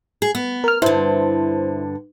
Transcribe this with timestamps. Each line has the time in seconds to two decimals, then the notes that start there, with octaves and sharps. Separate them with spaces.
0.22 G#4
0.35 B3
0.64 A#4 F6
0.82 G2 D3 E4 C5